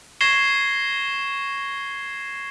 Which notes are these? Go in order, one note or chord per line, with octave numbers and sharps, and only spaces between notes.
C#6 G#6 A#6 C7 E7 G7